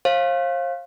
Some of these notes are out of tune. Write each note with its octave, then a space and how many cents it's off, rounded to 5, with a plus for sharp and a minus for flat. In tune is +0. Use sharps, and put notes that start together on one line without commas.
C5 +45 F5 +0